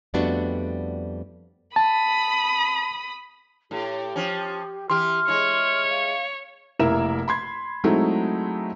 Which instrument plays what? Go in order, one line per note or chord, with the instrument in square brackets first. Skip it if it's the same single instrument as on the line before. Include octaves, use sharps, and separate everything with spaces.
[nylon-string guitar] F2 G3 A3 B3 D4 F#4
[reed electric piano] A5 [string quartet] B5 D#6
[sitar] A2 [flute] G4
[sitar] F3 C#4
[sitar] E3 G4 [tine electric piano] C6 [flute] F6
[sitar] G#3 E4 [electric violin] C#5
[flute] F5
[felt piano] F1 A#3 E4 A#4 E5 E7
B5 C6 G#6
F#3 G#3 A3 C4 D#4 E4